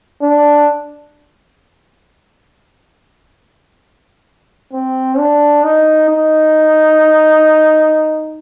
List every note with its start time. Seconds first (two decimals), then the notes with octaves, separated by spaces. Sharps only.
0.22 D4
4.73 C4
5.18 D4
5.64 D#4
6.09 D#4